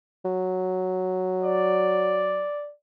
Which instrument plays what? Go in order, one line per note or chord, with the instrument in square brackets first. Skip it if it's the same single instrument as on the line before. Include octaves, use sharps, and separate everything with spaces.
[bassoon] F#3
[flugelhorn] D5